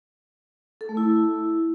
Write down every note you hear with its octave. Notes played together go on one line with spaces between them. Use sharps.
A4
A3
E4